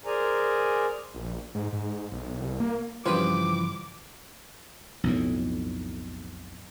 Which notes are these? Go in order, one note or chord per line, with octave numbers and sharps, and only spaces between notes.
G#4 A#4 C5 D5 G#5 A#5
A#1
G#2
G#2
B1
C2
A#3
G2 C#3 E3 F3 G3 C4 B4 D6
B1 F2 A2